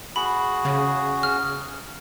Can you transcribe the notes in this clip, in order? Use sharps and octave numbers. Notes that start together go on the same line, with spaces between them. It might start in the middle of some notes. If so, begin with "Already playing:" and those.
F#4 G#4 B5
C#3
F6